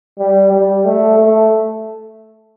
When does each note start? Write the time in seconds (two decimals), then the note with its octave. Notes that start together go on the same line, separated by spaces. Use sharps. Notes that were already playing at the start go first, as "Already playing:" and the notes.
0.19 G3
0.52 G3
0.85 A3
1.18 A3